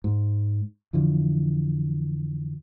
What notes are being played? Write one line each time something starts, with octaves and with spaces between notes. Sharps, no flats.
G#2
F2 D3 E3 F3